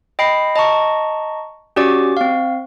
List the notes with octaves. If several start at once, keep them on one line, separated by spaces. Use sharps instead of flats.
D#5 G5 B5 C7
D#5 A5 A#5 C#6
C#4 F#4 G4 D5 D6
C4 F5